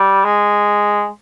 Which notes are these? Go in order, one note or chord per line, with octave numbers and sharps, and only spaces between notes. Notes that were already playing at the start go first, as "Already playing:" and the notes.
Already playing: G3
G#3